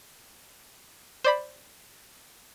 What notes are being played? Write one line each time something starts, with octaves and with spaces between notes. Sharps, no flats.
C5 D5 B5